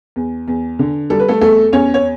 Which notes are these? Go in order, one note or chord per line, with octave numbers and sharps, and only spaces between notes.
E2
E2
D3
G3 A4
B4
A3 A4
E2 A3 A4
E2 C#4 C#5
C#5